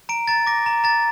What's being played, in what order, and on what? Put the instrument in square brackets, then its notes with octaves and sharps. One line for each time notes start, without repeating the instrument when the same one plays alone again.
[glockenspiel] A#5 D7
A#5 A6
D6 A#6
A#5
A#5 A6